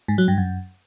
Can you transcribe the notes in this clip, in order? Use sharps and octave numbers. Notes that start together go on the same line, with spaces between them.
G#2
F#3
G2
F#2